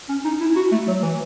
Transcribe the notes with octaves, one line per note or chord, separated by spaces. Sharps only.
C#4
D#4
E4
F#4
A3
F#3
E3